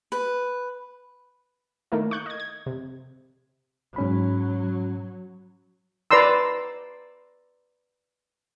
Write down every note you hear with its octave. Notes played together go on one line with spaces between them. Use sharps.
B4
D#3 A3 A#3 E4
C#6 F#6 G6
D#5 G#6
G#6
C3
G#2 F#3 C#4 B5
B4 D5 A#5 C6 E6